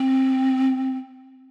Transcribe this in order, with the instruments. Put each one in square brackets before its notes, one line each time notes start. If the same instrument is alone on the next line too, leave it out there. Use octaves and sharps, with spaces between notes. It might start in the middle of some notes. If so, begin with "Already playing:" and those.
Already playing: [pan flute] C4